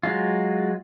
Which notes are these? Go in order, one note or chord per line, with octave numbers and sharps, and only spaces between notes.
F#3 G#3 F4